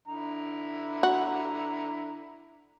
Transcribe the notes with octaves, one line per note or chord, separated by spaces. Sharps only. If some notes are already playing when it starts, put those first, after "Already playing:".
D3 E4 A#5
F#4